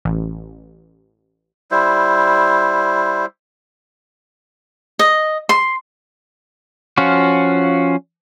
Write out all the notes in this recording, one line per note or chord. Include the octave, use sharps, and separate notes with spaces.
A1
G3 E4 C5
D#5
C6
F3 C#4 F4 F#4